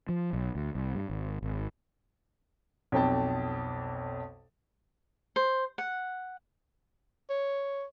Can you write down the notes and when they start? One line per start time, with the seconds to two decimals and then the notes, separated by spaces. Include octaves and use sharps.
0.09 F3
0.33 B1
0.55 D2
0.75 C2
0.95 G2
1.09 G#1
1.42 G#1
2.92 B1 F2 G5 A5
5.36 C5
5.78 F#5
7.30 C#5